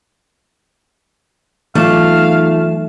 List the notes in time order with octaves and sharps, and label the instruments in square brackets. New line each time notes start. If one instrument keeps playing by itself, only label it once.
[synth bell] E3 D#4 E7 [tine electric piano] F#3 B3 F4 [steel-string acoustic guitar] A3 [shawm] F5